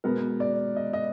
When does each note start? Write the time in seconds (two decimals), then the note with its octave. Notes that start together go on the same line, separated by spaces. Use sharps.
0.04 B2 G#3 B3 A#4
0.40 D5
0.76 D#5
0.93 D#5